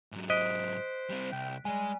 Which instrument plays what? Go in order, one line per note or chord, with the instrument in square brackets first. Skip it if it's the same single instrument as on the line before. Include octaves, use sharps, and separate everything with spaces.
[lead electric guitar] G#2 F#3
[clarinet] C5 [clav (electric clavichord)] D#5 [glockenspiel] F#6 B6 D7
[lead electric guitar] G3 C4
[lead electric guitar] C2 [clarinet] G5
[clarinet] G3 [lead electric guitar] G#3 [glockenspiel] G#5